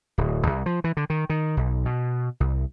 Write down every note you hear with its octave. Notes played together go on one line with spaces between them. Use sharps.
D1
C2
F3
E3
D3
D#3
D#3
B1
B2
C2